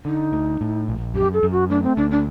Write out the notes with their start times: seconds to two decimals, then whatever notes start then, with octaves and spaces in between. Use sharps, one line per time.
0.05 D3 D#4
0.32 D2
0.61 A2
0.88 A#1
1.14 F#2 G4
1.33 A4
1.43 F#2
1.52 F#4
1.70 A3 D4
1.83 C4
1.97 D2 D4
2.11 D4